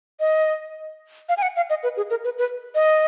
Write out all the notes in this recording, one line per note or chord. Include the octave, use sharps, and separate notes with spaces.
D#5
F5
G#5
F#5
F5
D#5
B4
G#4
A#4
B4
B4
D#5